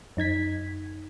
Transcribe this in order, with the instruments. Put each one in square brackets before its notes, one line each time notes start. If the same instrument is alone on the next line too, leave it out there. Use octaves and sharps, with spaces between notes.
[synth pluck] F#2 D#4 G#6 B6